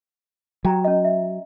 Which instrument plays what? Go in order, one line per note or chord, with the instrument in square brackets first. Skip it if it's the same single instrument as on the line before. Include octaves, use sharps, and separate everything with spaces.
[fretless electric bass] F#3 [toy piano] G4 G5 A#5
[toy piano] C#4 D#5
E5